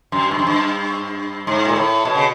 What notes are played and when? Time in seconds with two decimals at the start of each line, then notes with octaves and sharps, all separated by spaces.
0.12 F#2
0.31 G2
0.39 F#2
0.47 G2
1.47 G#2
1.65 A#2
1.76 A2
2.05 B2
2.15 C#3